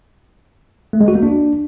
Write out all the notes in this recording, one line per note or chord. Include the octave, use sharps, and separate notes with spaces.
A3
G#3
F#4
A#3
D4